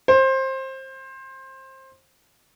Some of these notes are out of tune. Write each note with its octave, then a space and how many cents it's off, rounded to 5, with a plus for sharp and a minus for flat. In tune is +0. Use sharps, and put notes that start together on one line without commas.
C5 +20